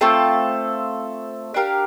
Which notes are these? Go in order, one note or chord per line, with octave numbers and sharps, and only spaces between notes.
A3 C4 F4 A4
D4 G4 A#4 F5